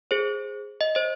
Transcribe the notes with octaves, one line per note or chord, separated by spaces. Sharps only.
G#4 C5
D#5
C5 D#5